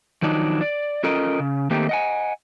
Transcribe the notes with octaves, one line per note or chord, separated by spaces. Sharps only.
D#3 F3 F#3 D4 D#4
D5
C#4 F4 A4 A#4 D#5
C#3
D#3 A3 A#3 C4 D#4 G4
D#5 F#5 G#5